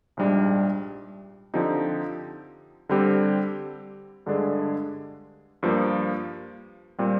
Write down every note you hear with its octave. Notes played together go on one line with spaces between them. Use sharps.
A#1 G#2 G3 D4
D3 F3 C4 D#4 G4
D3 G3 C4 G4
G2 D3 G#3 D4 G#4
G2 F3 A#3
A#2 G3 C4